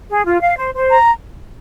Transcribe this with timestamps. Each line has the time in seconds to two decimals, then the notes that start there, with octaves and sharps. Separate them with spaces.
0.09 G#4
0.25 F4
0.41 F5
0.57 C5
0.75 C5
0.90 A#5